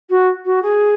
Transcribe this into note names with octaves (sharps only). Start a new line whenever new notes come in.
F#4
F#4
G#4